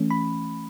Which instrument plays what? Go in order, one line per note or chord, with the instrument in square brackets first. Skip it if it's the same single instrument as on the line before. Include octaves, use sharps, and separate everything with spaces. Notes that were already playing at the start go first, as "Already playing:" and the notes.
Already playing: [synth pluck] E3 A3 C#4
B5